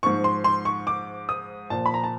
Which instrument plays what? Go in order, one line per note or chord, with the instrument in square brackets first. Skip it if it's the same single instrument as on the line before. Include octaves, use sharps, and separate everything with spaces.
[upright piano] G#2 F3 C#6
C6
C6
C#6
D6
D#6
A#2 F3 A5
B5
A#5
A5